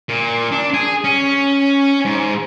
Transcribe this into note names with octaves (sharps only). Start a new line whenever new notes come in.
A#2
D4
G#4
C#4
G#2